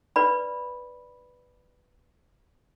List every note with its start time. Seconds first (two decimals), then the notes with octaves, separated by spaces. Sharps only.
0.16 B4 D5 B5